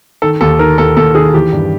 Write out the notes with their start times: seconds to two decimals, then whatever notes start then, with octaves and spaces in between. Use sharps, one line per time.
0.22 D#3 A4
0.41 D#2 A4
0.59 D#3 A#4
0.78 D#2 A4
0.97 D#2 A4
1.15 D#3 G#4
1.34 E3 G4
1.53 G2